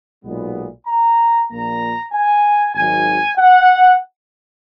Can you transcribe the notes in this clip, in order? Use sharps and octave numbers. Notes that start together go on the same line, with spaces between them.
B1 A#2 G#3 B3
A#5
A#1 A#2 A#3 A#5
G#5
G#1 G#2 F#3 G#5
F#5